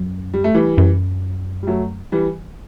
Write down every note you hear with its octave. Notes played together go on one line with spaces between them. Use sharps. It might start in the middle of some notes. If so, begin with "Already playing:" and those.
Already playing: F#2
G3
A3
E3 G3
F#2
G3
F#3 A3
E3 G3